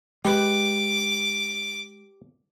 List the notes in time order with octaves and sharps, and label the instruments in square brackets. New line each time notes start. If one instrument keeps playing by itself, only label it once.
[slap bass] G#3 [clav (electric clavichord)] G4 B4 [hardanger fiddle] D6